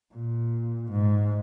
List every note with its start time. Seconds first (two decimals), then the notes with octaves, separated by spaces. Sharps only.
0.14 A#2
0.91 G#2